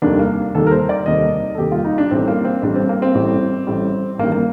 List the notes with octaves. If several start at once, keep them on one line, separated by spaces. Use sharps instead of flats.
F1 D#2 D#3 G3 D4
A#3
F1 D#2 D#3 G3 A4
A#4
C5
D5
F1 D#2 D#3 G3 D#5
A4
F1 D#2 D#3 G3 G4
F4
D#4
D4
A1 A2 G3 C4
A#3
C4
A1 A2 G3 D4
C4
A#3
C4
A1 A2 G3
A1 A2 G3
A1 G2 D#3 G3 A#3
A#3